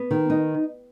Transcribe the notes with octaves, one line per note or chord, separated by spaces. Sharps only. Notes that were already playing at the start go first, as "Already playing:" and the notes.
Already playing: B3
D#3
D#4